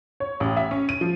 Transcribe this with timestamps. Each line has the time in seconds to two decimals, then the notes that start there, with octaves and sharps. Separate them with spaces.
0.20 C#5
0.40 A1
0.57 E5
0.71 C#4
0.89 D#7
1.01 F3